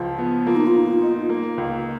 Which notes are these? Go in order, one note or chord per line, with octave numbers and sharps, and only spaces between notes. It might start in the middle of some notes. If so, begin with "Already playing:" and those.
Already playing: C#2 F3
B3
A#3 F4
D#4
F4
A#2
D#4
A#3
C#2